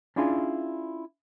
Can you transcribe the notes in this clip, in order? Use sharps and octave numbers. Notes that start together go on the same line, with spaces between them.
C#4 D4 E4 F4 G#4 G#5